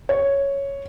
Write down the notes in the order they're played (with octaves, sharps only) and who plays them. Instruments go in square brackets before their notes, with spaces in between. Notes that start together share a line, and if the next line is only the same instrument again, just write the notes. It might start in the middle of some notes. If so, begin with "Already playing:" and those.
[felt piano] C#5